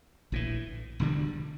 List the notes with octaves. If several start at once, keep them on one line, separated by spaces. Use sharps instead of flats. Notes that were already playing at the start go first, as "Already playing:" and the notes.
A#1 A2 E3
E1 D2 D3 G3